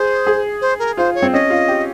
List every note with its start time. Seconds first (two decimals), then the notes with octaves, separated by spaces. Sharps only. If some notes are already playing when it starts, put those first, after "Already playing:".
Already playing: G#4 C5
0.27 G#4
0.61 C5
0.79 A#4
0.97 F4 C5
1.15 C#5
1.22 C4
1.33 C#4 D#5
1.50 F4
1.68 G4